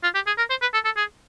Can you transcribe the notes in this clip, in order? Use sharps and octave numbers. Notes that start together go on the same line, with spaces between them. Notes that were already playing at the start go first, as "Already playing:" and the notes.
F4
G4
G#4
A#4
C5
B4
A4
A4
G#4